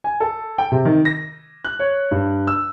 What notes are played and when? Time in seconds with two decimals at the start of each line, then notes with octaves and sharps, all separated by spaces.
0.04 G#5
0.20 A4
0.58 G5
0.72 C3
0.85 D#3
1.05 A#6
1.65 F#6
1.79 C#5
2.11 G2
2.47 E6